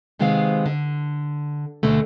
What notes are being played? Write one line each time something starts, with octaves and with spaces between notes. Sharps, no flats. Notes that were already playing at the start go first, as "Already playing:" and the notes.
C3 D#3 G#3 B3 C4 F5
D3
D2 B2 D3 A3